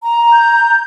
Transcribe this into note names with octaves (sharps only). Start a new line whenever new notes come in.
A#5
G6